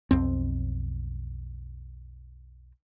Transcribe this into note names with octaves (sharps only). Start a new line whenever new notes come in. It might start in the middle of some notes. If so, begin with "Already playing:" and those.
B1 F2 C4